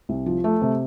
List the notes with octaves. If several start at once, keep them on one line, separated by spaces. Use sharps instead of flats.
C2
F3
A3
C3